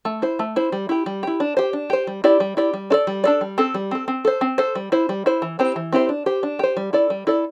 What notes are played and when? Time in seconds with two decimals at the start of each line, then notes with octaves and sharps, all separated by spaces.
0.05 A3
0.22 E4 C5
0.39 A3
0.56 E4 C5
0.72 G3
0.89 E4 G4
1.06 G3
1.23 E4 G4
1.40 D4
1.57 G4 C5
1.73 D4
1.90 G4 C5
2.07 G3
2.24 E4 G4 D5
2.40 G3
2.57 E4 G4 D5
2.74 G3
2.90 D4 A4 D5
3.07 G3
3.24 D4 A4 D5
3.41 G3
3.58 C4 A4
3.74 G3
3.91 C4 A4
4.08 C4
4.25 A4 C5
4.41 C4
4.58 A4 C5
4.75 G3
4.92 E4 C5
5.09 G3
5.26 E4 C5
5.42 E3
5.59 C4 E4 G4 C5
5.76 E3
5.93 C4 E4 G4 C5
6.09 D4
6.26 G4 C5
6.43 D4
6.59 G4 C5
6.77 G3
6.93 E4 A4 D5
7.10 G3
7.27 E4 A4 D5